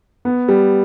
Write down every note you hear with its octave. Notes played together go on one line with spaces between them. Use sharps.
B3
G3